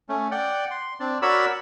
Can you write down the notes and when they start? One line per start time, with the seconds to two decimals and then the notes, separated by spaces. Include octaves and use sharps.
0.09 A3 C#4
0.31 D5 F#5 G5
0.71 C6
1.00 C4 D4 D5
1.22 F#4 A#4 C#5 D5 B5 E6